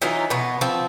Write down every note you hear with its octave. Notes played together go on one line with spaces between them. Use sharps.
E3 F#3 D#4 F4
B2 B3
F3 C4